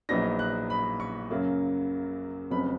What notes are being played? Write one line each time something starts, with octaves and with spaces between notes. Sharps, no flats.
A#1 A#2 F#3 B3 D#4 A#6
F#6
B5
C#6
F#2 C#3 F#3 A#3
F1 F2 C#3 F#3 B3 B5